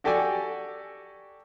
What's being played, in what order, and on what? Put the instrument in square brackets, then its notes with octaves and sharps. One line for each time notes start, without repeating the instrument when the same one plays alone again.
[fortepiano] F#4 G4 A4 D5 G5 G#5